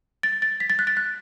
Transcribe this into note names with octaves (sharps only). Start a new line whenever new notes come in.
A6
A6
B6
A6
F#6
A6
F#6